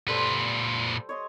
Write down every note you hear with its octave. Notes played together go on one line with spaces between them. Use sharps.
A#2 G3 A4 B4 C5
C#5 D#5 C6